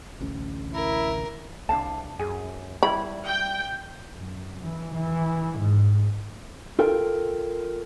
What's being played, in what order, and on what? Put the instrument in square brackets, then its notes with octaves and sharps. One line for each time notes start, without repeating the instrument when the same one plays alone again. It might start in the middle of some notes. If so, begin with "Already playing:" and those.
[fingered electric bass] A1 D2 C#4
[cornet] E4 [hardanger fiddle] A#4
[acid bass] C2 [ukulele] D4 F5 A5
[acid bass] F#2 [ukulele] G#4 G#5
[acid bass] G3 [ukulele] E4 [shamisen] B5
[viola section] G5
[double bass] F#2
E3
E3
G#2
[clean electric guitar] F4 A4 A#4 G5